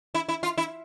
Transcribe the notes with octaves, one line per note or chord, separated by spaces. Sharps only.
E4
E4
F4
E4